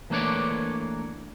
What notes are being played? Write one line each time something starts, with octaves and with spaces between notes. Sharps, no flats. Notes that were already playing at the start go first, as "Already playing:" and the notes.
E3 A3 A#3 D4 C#5 D5